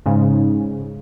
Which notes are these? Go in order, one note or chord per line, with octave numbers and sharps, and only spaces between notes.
G#2 C#3